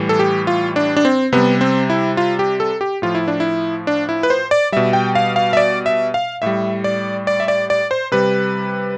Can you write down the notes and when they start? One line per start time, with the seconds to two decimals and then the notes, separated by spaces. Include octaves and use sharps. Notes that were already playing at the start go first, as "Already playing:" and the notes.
Already playing: A2 E3 G3
0.09 A4
0.19 G4
0.47 F4
0.76 D4
0.97 D4
1.05 C4
1.32 C3 G3 B3
1.61 C4
1.90 E4
2.17 F4
2.39 G4
2.60 A4
2.81 G4
3.02 A2 F3 F4
3.15 E4
3.28 D4
3.40 E4
3.87 D4
4.09 E4
4.23 B4
4.30 C5
4.51 D5
4.72 B2 G3 E5
4.93 G5
5.15 F5
5.36 F5
5.53 E5
5.57 D5
5.86 E5
6.14 F5
6.42 A2 G3 E5
6.84 D5
7.27 D5
7.40 E5
7.48 D5
7.70 D5
7.91 C5
8.12 C3 G3 B4